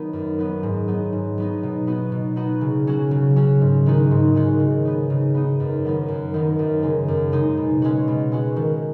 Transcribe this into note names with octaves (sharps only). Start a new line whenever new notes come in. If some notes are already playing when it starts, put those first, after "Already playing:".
Already playing: D#3 F#3 B3 D#4
F#2
F#3 B3 D#4
G#2
F#3 B3 D#4
G#2
F#3 B3 D#4
B2
B3 D#4 F#4
B2
B3 D#4 F#4
C#3
F#3 C#4 F#4
C#3
F#3 C#4 F#4
G#2
D#3 G#3 D#4 F#4
G#2
D#3 G#3 D#4 F#4
C#3
B3 D#4
C#3
B3 D#4
F#2
D#3 F#3 B3 D#4
F#2
D#3 F#3 B3 D#4
F#2
C#3 G#3 D#4
F#2
C#3 G#3 D#4
B2
G#3 C#4 F#4
B2
G#3 C#4 F#4
D#3